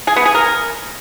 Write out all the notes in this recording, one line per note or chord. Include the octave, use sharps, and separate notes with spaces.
G#4
B3
G#4
A#4